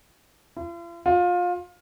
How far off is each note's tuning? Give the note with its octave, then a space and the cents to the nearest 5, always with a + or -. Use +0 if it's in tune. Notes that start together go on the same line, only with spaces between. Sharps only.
F4 -45
F4 +25